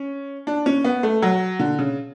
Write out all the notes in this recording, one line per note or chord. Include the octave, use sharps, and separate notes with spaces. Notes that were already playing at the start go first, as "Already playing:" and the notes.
Already playing: C#4
D4
C#4
B3
A3
F#3
D3
C#3